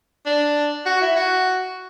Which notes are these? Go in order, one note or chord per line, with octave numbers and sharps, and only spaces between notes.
D4
F#4
E4
F#4